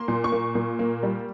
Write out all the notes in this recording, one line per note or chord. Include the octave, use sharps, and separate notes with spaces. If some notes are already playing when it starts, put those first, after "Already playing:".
Already playing: A#3 C6
A#2
C#6
A#3
A#2
A#3
G3